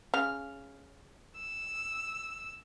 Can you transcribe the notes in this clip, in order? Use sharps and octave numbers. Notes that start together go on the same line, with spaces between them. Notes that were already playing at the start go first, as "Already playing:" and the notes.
C#3 F6
E6